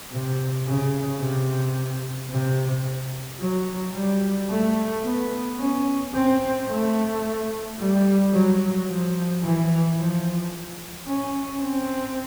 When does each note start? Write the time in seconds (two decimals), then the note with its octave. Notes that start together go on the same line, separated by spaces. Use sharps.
0.12 C3
0.66 C#3
1.21 C3
2.31 C3
3.41 F#3
3.95 G3
4.50 A3
5.05 B3
5.60 C#4
6.14 C4
6.69 A3
7.79 G3
8.34 F#3
8.88 F3
9.43 E3
9.98 F3
11.08 C#4
11.62 C4